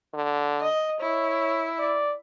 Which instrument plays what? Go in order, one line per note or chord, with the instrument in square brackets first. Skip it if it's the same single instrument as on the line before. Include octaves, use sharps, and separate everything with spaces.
[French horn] D3
[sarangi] D#5
[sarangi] E4 [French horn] C#5
[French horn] D5